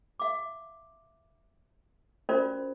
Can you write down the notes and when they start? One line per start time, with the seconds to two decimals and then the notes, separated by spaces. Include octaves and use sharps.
0.20 E5 F5 D6
2.29 C#4 F4 F#4 A#4 C5 D5